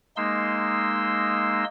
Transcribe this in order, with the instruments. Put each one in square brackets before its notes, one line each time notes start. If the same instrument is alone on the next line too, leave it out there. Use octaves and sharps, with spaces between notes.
[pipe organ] G#3 A#3 D#4 C6 E6